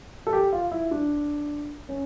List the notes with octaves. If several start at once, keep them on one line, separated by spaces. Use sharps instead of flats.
A4
G4
F4
E4
D4
C#4